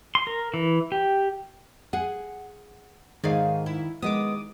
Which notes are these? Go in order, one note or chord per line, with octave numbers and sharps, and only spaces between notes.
C6
A#4
E3
G4
G#4 F#5
G#2 D#3 G#4 D5 F5
E4
D#3 G#3 B3 D6 D#6